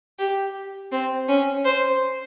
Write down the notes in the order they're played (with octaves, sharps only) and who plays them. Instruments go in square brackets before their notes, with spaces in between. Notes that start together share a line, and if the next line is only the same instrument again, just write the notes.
[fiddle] G4
C4
C#4
C5